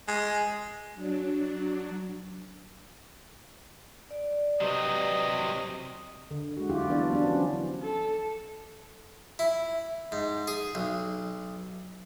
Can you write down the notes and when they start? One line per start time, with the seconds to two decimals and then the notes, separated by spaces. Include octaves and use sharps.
0.08 G#3
0.94 F#3 D4
4.11 D5
4.61 C3 F#3 G4 B4 D5 D#5
6.31 D3
6.57 G#3 F#4
6.70 F#3 E4 F4 G4
6.89 E3 B3 D4 G4 D5
7.11 F#3 B3 D4
7.23 F3 C#4
7.83 A4
9.39 E4
10.12 G#2
10.48 G#4
10.75 B1